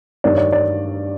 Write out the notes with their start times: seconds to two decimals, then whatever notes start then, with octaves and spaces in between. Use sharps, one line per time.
0.24 G2 D#3 D5
0.33 C#5
0.38 D5
0.52 D5